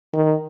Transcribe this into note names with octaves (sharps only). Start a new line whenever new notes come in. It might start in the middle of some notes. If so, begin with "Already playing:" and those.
D#3